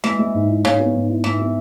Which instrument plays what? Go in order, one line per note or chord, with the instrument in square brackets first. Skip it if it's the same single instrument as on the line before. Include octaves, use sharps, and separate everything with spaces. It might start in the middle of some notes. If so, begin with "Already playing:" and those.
[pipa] E3 [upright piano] G#3
[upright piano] G#3
G#2
E4
[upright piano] G#2 [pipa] C#3
[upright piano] B3
G#2
E4
[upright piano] G#2 [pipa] E3
[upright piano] B3